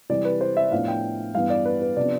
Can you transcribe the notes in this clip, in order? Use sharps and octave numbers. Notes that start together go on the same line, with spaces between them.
C3 E3 G3 D5
B4
C5
E5
A2 F3 B3 D4 F5
G5
G2 E3 B3 F5
D5
B4
B4
C3 F3 B3 D4 D5